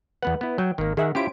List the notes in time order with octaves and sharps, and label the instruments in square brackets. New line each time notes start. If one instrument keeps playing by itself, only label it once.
[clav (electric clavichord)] E2 B3 F#5 [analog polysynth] B4
[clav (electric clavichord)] B3 E4
[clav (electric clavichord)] F#3 [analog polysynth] G5
[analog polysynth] G#1 [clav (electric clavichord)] D#3 A#3
[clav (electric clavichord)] D#3 [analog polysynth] G#4 E5 F#5
[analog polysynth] C#4 C5 D7 [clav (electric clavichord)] E4 F4 G4